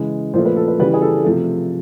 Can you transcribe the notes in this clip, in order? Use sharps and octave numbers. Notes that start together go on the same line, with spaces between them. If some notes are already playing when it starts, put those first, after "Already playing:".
Already playing: C#3 E3 G#3
A#2 F3 A3 C5
B4
A4
B4
C#3 E3 G3 B4
G#4
A4
C3 F3 A3